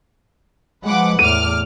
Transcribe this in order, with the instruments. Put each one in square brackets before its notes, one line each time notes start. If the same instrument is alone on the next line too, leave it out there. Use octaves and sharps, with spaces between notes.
[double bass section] F3 G#3 [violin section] B4 F#5 D6
[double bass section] E2 A2 [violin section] D6 F6 [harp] D#7